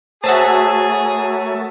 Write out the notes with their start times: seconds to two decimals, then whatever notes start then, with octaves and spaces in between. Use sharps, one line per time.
0.24 A3 F#4 G#4 A#4 C5 C#5 E5 A5